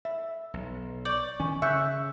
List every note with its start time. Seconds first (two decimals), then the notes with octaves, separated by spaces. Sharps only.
0.05 E5
0.54 B1
1.05 D5 C#6 G6
1.40 D#3 C#4 G#5 C#6
1.62 C#3 E5 C#6 E6 F#6 G6